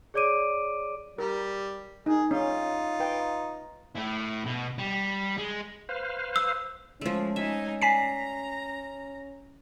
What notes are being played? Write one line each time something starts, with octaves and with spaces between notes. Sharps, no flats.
G#4 C#5 D5 D6 D7 D#7
G3 A#4
D#4 G#4
C#4 D#4 F4 C#5
B4 G5
A3 E4
B2
G3
G#3
B4 C5 F5
E6
F3 G#3 A3 C#4
G#3 D#4 E5 G#5
D5 G#5 A#5 B6 C7